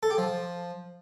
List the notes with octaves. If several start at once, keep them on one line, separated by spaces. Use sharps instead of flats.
A4
G4
F3